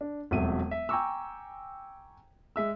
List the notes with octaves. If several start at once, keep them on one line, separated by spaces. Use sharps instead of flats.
D4
E1 F2 F#3 A3 E5 D#7
E5
G5 G#5 A#5 C#6 D6 E6
G#3 E5 E6